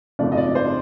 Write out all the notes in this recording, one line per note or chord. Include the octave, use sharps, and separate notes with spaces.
G#1 F#2 C#3 F3 A3 D5
D#5
D5
C5